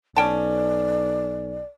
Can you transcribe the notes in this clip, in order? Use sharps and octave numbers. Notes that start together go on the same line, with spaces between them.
B1 C#4 D5 G5 A5